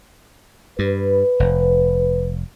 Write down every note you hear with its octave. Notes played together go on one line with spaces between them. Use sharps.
G2 B4
F1